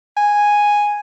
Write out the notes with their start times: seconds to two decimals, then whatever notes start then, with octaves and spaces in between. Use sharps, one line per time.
0.17 G#5